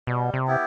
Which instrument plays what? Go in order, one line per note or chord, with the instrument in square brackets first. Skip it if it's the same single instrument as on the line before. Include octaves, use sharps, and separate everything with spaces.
[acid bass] B2 [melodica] G3
[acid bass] C3
[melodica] B3 E4 G4